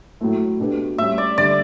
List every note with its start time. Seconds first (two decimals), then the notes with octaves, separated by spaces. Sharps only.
0.21 A2 F#3 A3 E4
0.60 B2 A3 D4 G4 B4
0.98 A2 G3 C#4 E5
1.18 D5
1.38 D3 G3 D4 D5